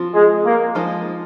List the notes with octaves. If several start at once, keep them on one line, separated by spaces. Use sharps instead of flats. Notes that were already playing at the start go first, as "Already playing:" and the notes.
Already playing: F3 C4 F4
G#3
A#3
F3 G#3 D#4 C5